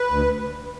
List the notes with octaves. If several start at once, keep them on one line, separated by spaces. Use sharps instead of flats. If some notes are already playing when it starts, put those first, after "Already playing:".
Already playing: B4
D2